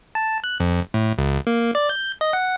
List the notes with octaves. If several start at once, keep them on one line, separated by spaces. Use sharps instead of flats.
A5
F#6
F2
A2
C#2
A#3
D5
G6
D#5
F#5